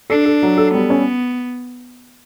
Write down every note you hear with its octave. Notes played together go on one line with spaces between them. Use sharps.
D4 A4
A4
F#3
A4
G3 B3
C#4